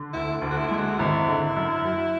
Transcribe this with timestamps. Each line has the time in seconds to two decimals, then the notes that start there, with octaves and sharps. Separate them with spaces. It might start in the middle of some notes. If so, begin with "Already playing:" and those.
Already playing: D3
0.13 D2 E4
0.42 D2
0.51 F#4
0.57 E4
0.67 G#3 E4
0.78 F#4
0.99 G#1 E4
1.28 D3
1.56 F#2
1.85 F#3